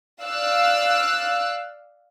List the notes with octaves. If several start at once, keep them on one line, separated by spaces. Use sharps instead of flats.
D5 F5 E6 F#6